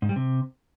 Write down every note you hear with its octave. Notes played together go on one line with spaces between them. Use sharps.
G#2
G3
C3